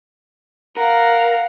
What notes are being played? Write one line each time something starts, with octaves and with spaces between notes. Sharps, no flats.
A#4 F5 F#5